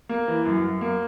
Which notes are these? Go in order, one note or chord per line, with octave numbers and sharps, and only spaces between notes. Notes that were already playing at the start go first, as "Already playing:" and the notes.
A#3
E3
F#2
F#2
A#3